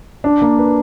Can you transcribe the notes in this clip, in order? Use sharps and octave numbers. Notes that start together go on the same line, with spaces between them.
D4
A#3
B4